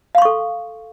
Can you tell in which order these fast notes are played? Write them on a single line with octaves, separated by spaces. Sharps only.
F5 C6 C#6 A4